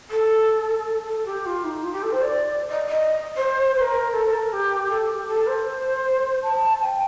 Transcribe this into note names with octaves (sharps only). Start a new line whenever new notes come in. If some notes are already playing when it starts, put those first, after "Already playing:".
A4
A4
G4
F4
D#4
F4
G4
A4
C5
D5
D#5
D#5
C5
C5
A#4
A4
A#4
G4
A4
G4
A4
C5
A5
G5